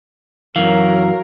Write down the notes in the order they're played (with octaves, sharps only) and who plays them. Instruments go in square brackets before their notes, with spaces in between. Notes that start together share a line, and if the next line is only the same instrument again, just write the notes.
[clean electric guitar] F#2 E3 [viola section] F#3 A#4 [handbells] F5